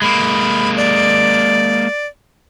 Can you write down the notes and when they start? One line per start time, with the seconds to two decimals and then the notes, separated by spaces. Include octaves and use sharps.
0.02 G#3 A#3 B5
0.77 D5